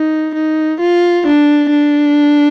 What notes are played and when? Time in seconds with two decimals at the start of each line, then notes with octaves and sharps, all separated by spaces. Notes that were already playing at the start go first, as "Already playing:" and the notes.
Already playing: D#4
0.35 D#4
0.80 F4
1.26 D4
1.70 D4